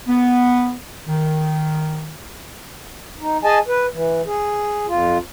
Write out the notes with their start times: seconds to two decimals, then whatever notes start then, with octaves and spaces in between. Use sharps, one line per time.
0.08 B3
1.07 D#3
3.20 D#4
3.44 G#4 D#5 G#5 A5
3.68 B4
3.93 E3
4.26 G#4
4.88 F2 F4